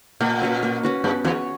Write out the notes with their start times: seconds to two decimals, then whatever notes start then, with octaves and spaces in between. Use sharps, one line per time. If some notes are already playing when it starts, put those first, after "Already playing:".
0.20 A#2 A#3
0.42 C#4 F#4 B4
0.63 A#3
0.83 C#4 F#4 B4
1.04 G2 B3
1.24 E2 F#4 C#5